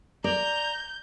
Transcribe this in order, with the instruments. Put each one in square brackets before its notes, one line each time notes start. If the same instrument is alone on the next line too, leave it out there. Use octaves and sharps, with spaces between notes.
[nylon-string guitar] D5 [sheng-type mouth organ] A#5 [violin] G6